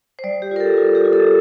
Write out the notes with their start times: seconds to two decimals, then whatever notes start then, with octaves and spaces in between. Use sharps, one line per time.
0.19 C5
0.24 G3 D5
0.42 G4
0.51 F4 A#4
0.60 A4
0.77 F4 G4
0.95 G4
1.04 F4
1.13 A4